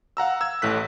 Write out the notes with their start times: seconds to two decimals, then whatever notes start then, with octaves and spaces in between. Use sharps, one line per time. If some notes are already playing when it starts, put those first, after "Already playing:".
0.17 F5 F#5 A#5 E6
0.41 E6 G#6
0.62 A1 A2 A3 F#6 B6